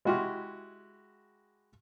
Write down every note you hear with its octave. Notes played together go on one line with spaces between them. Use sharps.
G#3 E4 F#4 G4 C6 F6